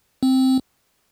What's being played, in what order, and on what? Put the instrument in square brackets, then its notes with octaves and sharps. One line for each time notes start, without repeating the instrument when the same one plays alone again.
[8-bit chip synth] C4